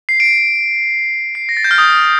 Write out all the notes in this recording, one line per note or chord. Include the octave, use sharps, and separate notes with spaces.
C7
D7
C7
A#6
A6
G6
F6
D#6